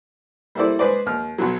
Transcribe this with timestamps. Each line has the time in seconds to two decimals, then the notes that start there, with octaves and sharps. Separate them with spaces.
0.55 G3 A#3 E4 A4 C5 D5
0.79 G#3 G#4 B4 C5 D5
1.06 D#2 F6
1.38 B1 F#3